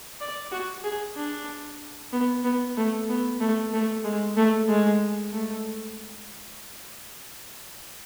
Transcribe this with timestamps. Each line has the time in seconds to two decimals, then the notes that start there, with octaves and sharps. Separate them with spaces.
0.20 D5
0.51 F#4
0.84 G#4
1.16 D4
2.12 B3
2.44 B3
2.77 A3
3.09 B3
3.40 A3
3.73 A3
4.04 G#3
4.37 A3
4.68 G#3
5.33 A3